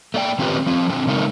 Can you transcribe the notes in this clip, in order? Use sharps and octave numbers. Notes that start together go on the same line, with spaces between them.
A3 A#3 D5 G5
D#3 C4 C#4 F4 G4 B4
F3 C4
D3 C4
C#3 G#3 A3 D#4 A#4